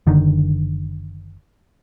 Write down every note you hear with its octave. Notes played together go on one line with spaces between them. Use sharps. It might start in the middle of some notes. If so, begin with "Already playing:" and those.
F#1 D3 D#3